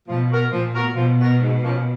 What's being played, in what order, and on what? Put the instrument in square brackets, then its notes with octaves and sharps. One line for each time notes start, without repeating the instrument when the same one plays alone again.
[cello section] B2 [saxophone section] F3
[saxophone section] B3 F#4 A#4
[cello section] A#2 [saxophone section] F3
[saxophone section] B3 F#4 A#4
[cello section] B2 [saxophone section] F3
[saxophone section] B3 F#4 A#4
G#2
F3 A#3 C#4